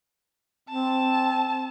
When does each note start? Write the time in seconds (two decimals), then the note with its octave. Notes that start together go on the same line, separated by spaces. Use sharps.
0.69 C4 A5